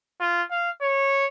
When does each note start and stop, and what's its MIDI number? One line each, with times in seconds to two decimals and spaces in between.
0.20 0.43 65
0.51 0.70 77
0.82 1.26 73